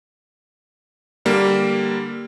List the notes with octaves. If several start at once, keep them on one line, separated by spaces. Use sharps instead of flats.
D3 G3 A#3